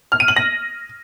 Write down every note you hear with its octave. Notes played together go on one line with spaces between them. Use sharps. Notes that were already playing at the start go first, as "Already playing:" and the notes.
F6
D#7
F#7
A#6